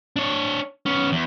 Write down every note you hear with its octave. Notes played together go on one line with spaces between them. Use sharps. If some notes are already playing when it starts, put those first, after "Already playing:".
D4 C#5
B3 C#4
E2